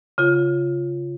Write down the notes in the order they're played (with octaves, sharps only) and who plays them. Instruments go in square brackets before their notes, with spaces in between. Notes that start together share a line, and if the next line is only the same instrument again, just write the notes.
[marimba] C#3 F4